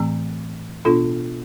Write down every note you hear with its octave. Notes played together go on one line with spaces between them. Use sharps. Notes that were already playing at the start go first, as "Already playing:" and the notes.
Already playing: A2 E3 A3 C4
B2 B3 D4 F4 A4